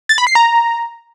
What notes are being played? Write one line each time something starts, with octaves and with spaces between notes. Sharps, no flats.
A6
B5
C7
A#5